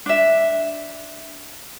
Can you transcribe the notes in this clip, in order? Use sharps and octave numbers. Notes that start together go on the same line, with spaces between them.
D4 E5